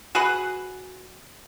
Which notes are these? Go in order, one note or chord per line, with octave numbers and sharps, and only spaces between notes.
F#4 G#4 B4 F#5